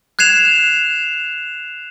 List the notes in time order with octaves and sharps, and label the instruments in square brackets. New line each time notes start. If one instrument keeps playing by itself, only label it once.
[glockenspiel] F#6 G#6 C7 E7 F7